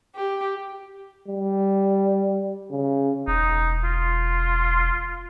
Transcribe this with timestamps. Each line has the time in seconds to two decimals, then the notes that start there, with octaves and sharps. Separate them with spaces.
0.15 G4
1.28 G3
2.71 C#3
3.28 E1 D#4
3.84 F4